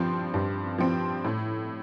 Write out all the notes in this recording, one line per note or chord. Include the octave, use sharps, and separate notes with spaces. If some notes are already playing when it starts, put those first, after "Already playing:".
Already playing: G2 F3 C4
G2
F3 C4
A2